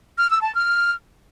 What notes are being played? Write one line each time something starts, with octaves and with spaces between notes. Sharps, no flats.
F6
E6
A5
F6